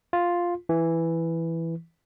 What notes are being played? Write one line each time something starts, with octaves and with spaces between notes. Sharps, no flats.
F4
E3